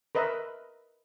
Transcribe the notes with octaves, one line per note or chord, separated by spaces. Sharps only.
A#4 B4 D#5 E5